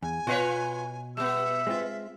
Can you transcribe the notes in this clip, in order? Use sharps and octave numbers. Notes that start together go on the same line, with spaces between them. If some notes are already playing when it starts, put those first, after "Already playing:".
E2 G#5
B2 F4 B4 C#5 D#5 F5
G3 B3 E5 E6
G#3 C4 F4